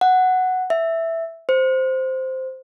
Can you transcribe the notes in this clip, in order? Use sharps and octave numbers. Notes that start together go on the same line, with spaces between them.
F#5
E5
C5